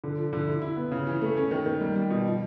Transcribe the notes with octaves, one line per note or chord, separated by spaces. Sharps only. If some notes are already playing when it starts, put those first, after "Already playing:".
D3
F3
D3
E4
E4
B3
C#3
E3
A3
C#4
D#3
D#3
G3
G3
B2
F3